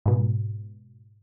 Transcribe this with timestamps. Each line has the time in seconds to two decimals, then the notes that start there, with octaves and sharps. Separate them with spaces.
0.06 G#2 B2